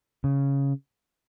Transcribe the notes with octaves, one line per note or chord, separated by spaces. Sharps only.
C#3